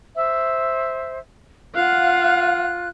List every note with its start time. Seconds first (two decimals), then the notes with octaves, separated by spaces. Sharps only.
0.15 C5 E5
1.74 F4 F5 F#5 F#6